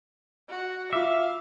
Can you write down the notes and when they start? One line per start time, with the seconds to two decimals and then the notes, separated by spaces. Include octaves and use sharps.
0.49 F#4
0.93 F4 E5 F5 D6